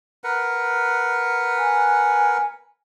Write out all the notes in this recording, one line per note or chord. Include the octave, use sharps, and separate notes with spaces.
A#4 B4 F#5
G#5